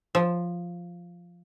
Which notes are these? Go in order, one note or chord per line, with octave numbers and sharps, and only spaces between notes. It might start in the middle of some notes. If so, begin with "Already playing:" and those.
F3